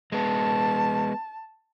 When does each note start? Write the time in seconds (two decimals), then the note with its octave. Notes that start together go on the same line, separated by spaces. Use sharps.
0.12 G#3 B3 A5